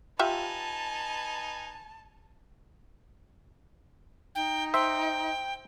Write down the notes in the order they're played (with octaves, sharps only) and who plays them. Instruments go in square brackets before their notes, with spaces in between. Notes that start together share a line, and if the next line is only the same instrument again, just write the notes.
[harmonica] D#4 B4 G#5 [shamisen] F4 G4 E5 [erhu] A5
[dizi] D#4 [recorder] G5
[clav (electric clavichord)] C5 E5 [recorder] G5